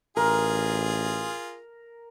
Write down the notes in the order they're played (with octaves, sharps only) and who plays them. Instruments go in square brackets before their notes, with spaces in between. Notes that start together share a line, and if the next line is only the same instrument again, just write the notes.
[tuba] A1 [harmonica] F4 G#4 [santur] A#4